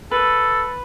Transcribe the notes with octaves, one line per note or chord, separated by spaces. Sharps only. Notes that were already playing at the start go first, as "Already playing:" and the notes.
A4 B4